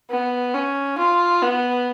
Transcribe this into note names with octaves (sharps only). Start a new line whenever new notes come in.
B3
C#4
F4
B3